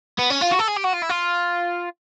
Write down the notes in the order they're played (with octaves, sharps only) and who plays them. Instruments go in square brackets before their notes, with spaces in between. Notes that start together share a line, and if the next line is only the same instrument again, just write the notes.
[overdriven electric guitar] B3
C#4
F4
F#4
A4
G#4
G4
F#4
F4
E4
F4